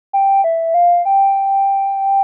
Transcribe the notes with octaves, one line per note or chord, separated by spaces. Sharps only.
G5
E5
F5
G5